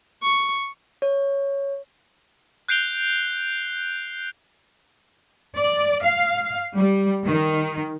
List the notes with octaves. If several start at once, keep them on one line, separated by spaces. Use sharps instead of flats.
C#6
C#5
F#6 G6 C7 D7 F7 G7
D5
F5
G3
D#3